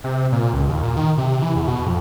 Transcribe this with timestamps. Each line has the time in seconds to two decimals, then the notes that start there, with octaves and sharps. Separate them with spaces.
0.04 C3
0.32 A#2
0.53 C#2
0.69 D#2
0.83 A#2
0.97 D#3
1.18 C3
1.42 E3
1.56 E2
1.68 B2
1.86 F2